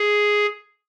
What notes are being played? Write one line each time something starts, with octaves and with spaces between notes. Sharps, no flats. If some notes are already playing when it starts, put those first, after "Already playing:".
Already playing: G#4